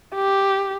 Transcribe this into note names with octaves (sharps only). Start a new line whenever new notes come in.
G4